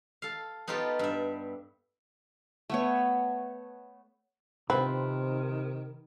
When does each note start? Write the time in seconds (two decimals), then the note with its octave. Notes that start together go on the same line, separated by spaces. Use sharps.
0.22 A4 F5
0.68 B3 D#4 F4 G4 A4
0.99 G2 E5
2.70 A3 B3 C#5
4.70 C3 D#3 F3 C4 B4